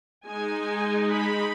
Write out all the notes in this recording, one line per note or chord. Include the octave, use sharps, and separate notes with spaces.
G#3 D#4 G#5
B5